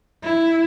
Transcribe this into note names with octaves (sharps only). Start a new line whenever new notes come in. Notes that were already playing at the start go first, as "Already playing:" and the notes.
E4